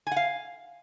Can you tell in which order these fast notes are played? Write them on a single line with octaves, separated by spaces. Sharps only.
G#5 F#5 F5